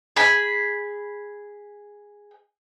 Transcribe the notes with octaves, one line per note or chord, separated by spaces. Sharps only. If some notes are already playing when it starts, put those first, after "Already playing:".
G#4 B5